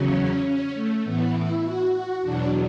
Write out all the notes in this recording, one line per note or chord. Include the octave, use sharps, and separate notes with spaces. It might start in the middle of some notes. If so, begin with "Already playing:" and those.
Already playing: E2 C#3 F#3 C#4
C#4
A3
A2 E3 B3
E4
F#4
F#4
E2 B2 F#3 D4